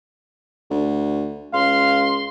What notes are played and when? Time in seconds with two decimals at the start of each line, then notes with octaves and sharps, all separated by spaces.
0.70 D2
1.53 C#2 F5 C6